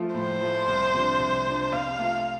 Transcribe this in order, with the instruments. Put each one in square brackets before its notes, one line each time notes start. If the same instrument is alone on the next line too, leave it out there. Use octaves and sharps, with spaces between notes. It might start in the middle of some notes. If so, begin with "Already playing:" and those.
Already playing: [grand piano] F3 A3 F4
[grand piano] A2 [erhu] C5
[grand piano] F3 A3 F4
C2
C3 F3 D4
C2
C3 F3 D4
[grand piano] C3 [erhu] F5
[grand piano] A3 F4